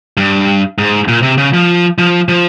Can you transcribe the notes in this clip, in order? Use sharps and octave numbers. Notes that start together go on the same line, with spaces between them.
G2
G#2
A#2
C3
C#3
F3
F3
F3